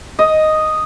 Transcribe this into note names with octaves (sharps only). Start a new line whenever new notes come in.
D#5